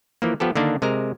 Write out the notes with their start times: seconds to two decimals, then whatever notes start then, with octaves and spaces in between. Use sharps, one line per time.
0.22 E3 F3 A#3
0.40 F3 B3 G4 A4
0.55 D3 D#3 A#3 D4
0.82 C3 G#3 A#4 A#5